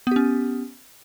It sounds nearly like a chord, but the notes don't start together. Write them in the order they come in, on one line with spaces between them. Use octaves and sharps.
B3 G4 C#4